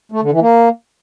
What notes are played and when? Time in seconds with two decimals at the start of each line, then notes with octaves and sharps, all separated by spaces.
0.12 A3
0.22 D3
0.31 E3
0.41 A#3